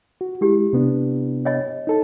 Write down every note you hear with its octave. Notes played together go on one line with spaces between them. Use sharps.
F#4
G#3 E4 G4
C3 B3 D4
C#5 D#5
D#4 A4 A5